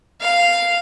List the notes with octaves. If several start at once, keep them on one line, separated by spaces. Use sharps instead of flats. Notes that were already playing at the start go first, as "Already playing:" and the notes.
F5